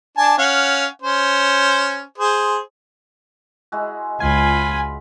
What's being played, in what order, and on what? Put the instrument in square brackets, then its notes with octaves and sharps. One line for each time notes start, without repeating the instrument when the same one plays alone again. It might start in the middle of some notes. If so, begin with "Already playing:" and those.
[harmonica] D4 G#5 A5
C#4 F5 F#5
C#4 C5
G#4 C5
[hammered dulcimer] G#3 E4 F#4
[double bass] C#2 [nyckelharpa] F4 B5 [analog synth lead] G#5